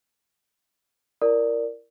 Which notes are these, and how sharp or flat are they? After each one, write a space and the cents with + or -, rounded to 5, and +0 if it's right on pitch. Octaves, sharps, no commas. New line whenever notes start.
E4 +15 A#4 +0 D5 +0